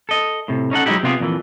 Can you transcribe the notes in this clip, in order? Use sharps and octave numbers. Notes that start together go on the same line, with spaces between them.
A4 D#5
A2 C3
C#4 D#4 A4 F#5
F#3 G#3 A3 D#4 E4 G4
C3 B3 F4 G4 G#4
F2 A#2 D3 E3